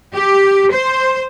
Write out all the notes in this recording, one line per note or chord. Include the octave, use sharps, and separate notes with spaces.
G4
C5